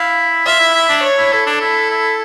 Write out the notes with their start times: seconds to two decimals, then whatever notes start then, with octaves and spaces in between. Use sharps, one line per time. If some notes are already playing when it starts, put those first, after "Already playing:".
Already playing: E4 F5
0.46 F4 E5
0.60 E4
0.75 E4
0.89 D4
1.03 C#5
1.18 E4
1.32 E4 A4
1.46 D4
1.61 E4
1.90 E4